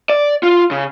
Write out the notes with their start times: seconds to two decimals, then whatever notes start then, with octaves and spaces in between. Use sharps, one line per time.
0.09 D5
0.43 F4
0.71 C#3